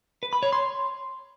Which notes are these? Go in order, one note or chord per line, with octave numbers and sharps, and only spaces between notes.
B4
B5
C#5
C6